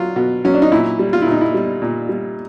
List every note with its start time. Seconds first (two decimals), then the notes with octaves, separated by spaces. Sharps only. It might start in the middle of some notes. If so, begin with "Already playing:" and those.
Already playing: F#3 F4
0.16 B2
0.45 F#3 C#4
0.54 D4
0.62 D#4
0.72 A#2 E4
0.99 G3
1.13 F4
1.22 A#2 E4
1.32 D#4
1.41 E4
1.54 G3
1.82 A#2
2.09 G3